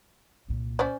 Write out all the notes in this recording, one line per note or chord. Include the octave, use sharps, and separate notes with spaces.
C2 A#2
C#4 C5 D5